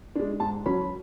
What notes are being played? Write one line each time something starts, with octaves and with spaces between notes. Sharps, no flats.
G#3 D4
G#2 A5
F#3 C#4 B5